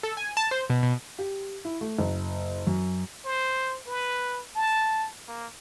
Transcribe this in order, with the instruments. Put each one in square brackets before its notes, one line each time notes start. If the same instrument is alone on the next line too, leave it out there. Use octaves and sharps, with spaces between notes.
[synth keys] A4
G#5
A5
C5
B2
B2
[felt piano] G4
E4
A3
F#1
F#2
[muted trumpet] C5
B4
A5
A#3